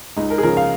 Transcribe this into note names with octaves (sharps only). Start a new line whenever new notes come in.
C#2 D#4
A#4
G#4
C#3 F3 A#4
F5